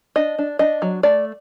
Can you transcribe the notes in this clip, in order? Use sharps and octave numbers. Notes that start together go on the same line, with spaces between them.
D4 D#5
D4
D4 D#5
F#3
A3 D5